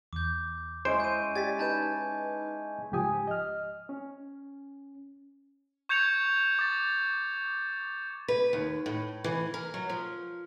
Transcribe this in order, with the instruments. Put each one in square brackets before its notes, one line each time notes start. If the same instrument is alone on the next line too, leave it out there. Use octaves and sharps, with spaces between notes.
[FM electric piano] E2 [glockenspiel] D6 G6
[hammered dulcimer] G#3 C#4 E4 [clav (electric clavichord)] C5 [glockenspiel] D7
[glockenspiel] G6 D#7
[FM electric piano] G4 D5 A6 [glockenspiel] G#6 B6
[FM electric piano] D#4 B4 [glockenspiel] A5 G6
[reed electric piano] C#2 G#2 F3 G4 G#5 D#6
D#5 F6
C#4
[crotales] C#6 G6 G#6 C#7 F7
D6 A6
[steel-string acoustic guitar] B4
D#2
A2
E3
A#4
F#3
F3